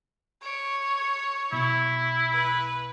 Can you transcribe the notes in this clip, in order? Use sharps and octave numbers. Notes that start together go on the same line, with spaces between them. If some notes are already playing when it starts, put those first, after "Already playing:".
C#5 D7
B1 B2 E4
B4